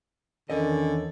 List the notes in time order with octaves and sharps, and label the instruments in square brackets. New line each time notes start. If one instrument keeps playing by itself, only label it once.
[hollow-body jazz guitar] E2 A#4 D#5 [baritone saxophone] D3 [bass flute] D#3 [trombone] C#4